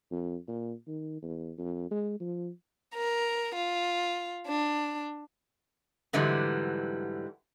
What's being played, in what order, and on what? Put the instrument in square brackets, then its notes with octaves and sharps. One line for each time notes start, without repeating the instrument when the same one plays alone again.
[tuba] F2
A#2
D#3
E2
F2
G#3
F3
[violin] A#4
F4
D4
[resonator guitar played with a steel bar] G#2 D3 E3 F#3 G3